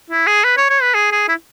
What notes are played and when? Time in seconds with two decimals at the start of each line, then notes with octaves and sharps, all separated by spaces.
0.10 E4
0.27 G#4
0.44 B4
0.57 C#5
0.70 C#5
0.82 B4
0.94 G#4
1.12 G#4
1.28 E4